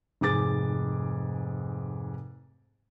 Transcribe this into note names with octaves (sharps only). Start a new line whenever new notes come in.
F1 G#2 G#4 D6 A6